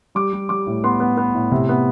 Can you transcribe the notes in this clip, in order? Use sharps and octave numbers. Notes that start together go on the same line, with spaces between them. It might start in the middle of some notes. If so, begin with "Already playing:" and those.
G3 D6
G3
G3 D6
A2
B3 C6
B3
B3
A2
C3
B3